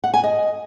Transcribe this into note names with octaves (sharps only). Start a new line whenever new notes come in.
F#5
G#5
D#5